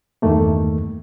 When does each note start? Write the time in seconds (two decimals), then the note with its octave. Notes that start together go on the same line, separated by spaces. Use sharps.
0.22 E2 G2 D#3 A3 A#3